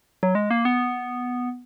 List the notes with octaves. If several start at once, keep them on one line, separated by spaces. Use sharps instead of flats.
F#3
G#3
A#3
B3